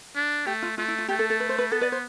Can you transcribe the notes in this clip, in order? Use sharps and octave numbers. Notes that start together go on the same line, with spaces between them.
D4
A3 G4
F4
A3 F4
E4
F4
A3 G4
A4
A4
B4
C5
B4
B3 A4
B4 D5
C5